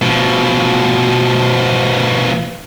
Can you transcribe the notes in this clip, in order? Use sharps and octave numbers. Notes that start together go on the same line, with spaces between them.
B2 F3